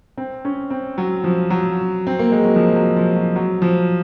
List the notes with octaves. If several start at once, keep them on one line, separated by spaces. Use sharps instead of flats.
C4
C#4
C4
F#3
F3
F#3
C4
A#3
G#3
F#3
F3
F#3
F3
F#3
F#3
F3